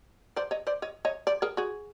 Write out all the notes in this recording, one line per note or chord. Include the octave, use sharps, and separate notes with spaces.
C5 D5
C#5 D#5
C5 D5
C#5 D#5
C#5 D#5
C5 D5
G#4 A#4
F#4 G#4